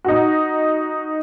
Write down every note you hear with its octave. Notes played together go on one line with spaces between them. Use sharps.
D#4 F#4